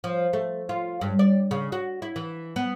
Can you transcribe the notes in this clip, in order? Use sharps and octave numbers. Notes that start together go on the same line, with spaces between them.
F3
A3
F4
G2
D5
C#3
F#4
E4
E3
B3